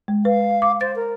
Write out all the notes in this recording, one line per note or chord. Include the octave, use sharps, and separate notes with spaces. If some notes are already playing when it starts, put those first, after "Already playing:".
G#3
B4 F5
D6
C5 A6
A#4